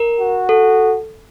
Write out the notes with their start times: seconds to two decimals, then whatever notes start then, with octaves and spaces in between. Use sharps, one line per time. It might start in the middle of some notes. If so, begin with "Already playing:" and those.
Already playing: A#4
0.20 F#4
0.49 A4